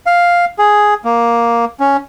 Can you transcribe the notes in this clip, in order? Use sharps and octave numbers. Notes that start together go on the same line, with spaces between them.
F5
G#4
A#3
C#4